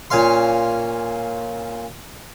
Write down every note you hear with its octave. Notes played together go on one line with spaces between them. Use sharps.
A#2 C#4 F5 C6